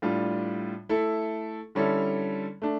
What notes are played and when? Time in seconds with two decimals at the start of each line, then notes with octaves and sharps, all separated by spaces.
0.02 A2 G3 D4 F4
0.89 A3 E4 A4
1.75 D3 G3 C#4 E4 A4
2.62 A3 D4